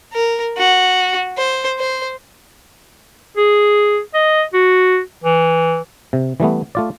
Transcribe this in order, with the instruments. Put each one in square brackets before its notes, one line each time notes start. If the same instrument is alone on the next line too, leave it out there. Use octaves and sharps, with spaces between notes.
[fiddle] A#4
F#4
C5
C5
[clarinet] G#4
D#5
F#4
E3
[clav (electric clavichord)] C3
E3 G3 A3 B3
A3 F4 D5